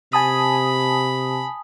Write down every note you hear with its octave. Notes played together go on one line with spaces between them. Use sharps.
C3 G#5 A5 B5 D#6